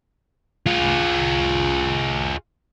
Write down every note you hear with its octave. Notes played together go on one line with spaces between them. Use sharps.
F4 G#4